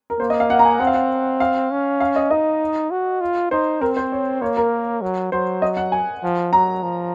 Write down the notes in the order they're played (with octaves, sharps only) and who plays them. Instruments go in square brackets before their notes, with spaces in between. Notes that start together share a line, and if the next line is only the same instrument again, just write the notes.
[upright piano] A#4
[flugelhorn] A#3 [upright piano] C5
[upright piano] D#5
F5
F#5
A#5
G#5
[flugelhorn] C4 [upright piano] F#5
[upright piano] F5
F#5
F5
[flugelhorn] C#4
[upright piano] F5
D#5
[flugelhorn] D#4 [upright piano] D#5
[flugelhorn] F#4
F4
[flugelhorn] D#4 [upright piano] C5
[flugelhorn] C4 [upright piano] A#4
[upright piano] C5
C#5
[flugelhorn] A#3 [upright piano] C#5
[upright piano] A#4
[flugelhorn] F#3
[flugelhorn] F#3 [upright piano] C5
[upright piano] D#5
F#5
G#5
[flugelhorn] F3
[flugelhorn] F#3 [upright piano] A#5
[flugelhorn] F3